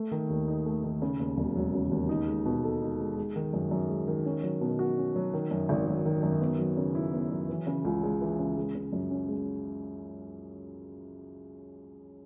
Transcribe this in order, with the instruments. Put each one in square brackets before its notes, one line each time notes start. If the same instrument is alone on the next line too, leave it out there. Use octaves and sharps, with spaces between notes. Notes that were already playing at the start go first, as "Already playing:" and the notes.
Already playing: [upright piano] A3
D#3
D#2
D#4
A3
D#3
C#3
D#2
E1
F#3
C#3
D#2
D#4
G#3
B2
A4
D#4
G#3
G#3
D#3
F#2
F#2
G#3
D#3
C#4
F#3
B2
F#4
C#4
F#3
D#3
F#2
G#1
F#3
D#3
F#2
B3
F#3
C#3
E4
B3
F#3
E3
C#3
C#2
G#3
E3
C#3
G#3
C#3
F#2
C#4
G#3